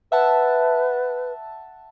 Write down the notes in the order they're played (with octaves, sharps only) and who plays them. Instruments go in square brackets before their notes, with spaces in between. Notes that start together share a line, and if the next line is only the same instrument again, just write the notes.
[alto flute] B4 [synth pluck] E5 F#5 A5